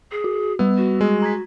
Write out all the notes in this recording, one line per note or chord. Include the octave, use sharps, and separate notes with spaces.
G#4
F#4
G3 B3 E6
F#4
G#3
A#5 G#6 B6